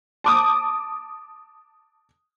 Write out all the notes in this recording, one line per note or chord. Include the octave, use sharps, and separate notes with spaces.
A5 D6 D#6